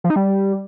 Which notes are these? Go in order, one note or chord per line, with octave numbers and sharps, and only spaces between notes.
F3
D#4
G3